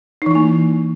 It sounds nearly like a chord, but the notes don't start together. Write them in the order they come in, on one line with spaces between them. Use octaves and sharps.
D#4 E3 E4 A#3